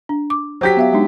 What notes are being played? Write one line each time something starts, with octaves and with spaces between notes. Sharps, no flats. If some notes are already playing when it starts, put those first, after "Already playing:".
D4
D6
F#3 G4 C5 B6
B3 E5 F5
G#3 D4 D#4